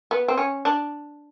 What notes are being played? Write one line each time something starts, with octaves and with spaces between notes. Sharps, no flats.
B3
C4
C#4
D4